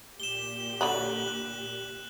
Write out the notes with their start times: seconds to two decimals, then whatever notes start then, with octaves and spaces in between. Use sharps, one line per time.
0.20 A#2 G4 E7 G7
0.81 D3 F#3 B5 F#6 F#7
1.28 F#6